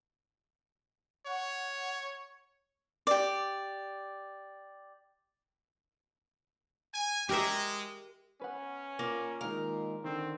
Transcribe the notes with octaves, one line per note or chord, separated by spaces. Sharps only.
C#5 F#5
G4 D5
G#5
G#3 G4 A#4 E5
C#4 B4 F#5
A#2 A#3
D#3 G#3 A#3 A#4
D3 D#3 C4